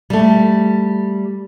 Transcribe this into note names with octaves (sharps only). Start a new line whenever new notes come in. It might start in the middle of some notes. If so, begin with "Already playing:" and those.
G3 A3